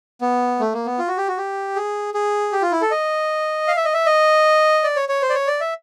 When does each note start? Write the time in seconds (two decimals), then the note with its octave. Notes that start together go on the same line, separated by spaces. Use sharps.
0.21 B3
0.60 A3
0.73 A#3
0.86 B3
0.99 F4
1.08 F#4
1.18 G4
1.28 F#4
1.37 G4
1.76 G#4
2.14 G#4
2.52 G4
2.62 F4
2.72 E4
2.81 A4
2.91 D#5
3.68 F5
3.77 E5
3.85 D#5
3.94 E5
4.06 D#5
4.84 D5
4.96 C#5
5.09 C#5
5.22 C5
5.30 D5
5.35 C#5
5.47 D5
5.60 E5